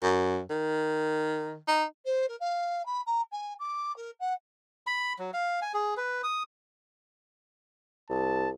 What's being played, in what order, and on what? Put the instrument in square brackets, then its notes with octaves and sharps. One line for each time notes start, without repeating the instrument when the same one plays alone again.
[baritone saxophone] F#2
D#3
D#4
[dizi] C5
A#4
F5
B5
A#5
G#5
D6
A#4
F#5
[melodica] B5
F#3
F5
G#5
G#4
B4
D#6
[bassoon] C2 [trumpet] A5